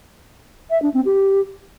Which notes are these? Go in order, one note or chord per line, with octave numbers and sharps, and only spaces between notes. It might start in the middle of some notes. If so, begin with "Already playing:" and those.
E5
D4
C4
G4